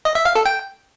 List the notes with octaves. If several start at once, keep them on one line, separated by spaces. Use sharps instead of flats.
D#5
E5
F5
A4
G5